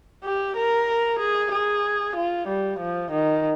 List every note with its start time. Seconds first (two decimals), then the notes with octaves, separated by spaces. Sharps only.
0.24 G4
0.57 A#4
1.20 G#4
1.52 G#4
2.16 F4
2.48 G3
2.80 F3
3.12 D#3